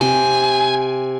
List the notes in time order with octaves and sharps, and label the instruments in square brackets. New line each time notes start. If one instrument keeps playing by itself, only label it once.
[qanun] C3 C5 [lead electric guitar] G#5